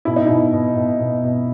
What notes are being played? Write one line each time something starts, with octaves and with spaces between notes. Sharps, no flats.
B2 E4
D#4
B2 E4
B2
B2
B2
B2